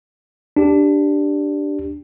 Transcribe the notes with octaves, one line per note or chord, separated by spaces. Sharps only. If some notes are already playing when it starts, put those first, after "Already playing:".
D4 G4